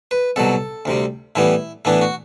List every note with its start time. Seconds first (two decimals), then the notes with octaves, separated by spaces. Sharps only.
0.11 B4
0.36 C2 B2 F#3 A4
0.85 D2 C3 G3
1.36 A2 E3 G3 B3 E4
1.85 A2 E3 B3 D4 E4
2.02 F#4